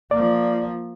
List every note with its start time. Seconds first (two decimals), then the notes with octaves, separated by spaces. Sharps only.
0.11 F3 A#3 D5